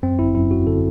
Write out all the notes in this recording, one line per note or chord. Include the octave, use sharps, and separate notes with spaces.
F#2 C4
G1 E4
F#2 E4
F#2 F#4
D3 A4